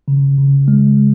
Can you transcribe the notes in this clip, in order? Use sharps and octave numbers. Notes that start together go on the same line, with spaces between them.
C#3
C#3
G#3